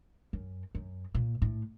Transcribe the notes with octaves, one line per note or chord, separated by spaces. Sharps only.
F#2
F#2
A#2
A2